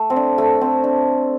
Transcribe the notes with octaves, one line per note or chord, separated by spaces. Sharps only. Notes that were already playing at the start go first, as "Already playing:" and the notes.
Already playing: A3
C4
D4
A3
C4
D4